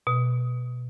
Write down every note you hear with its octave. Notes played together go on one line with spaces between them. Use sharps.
B2